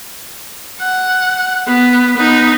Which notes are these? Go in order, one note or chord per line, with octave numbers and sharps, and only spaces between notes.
F#5
B3
B3 D#4